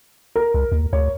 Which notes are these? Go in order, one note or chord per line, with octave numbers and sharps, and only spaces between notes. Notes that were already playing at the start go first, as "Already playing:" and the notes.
A#4
C#2
D#2
D2 C#5